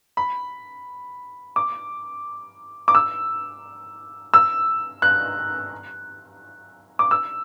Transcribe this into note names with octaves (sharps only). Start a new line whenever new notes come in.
B5
D6
D6
E6
E6
F#6
D6
E6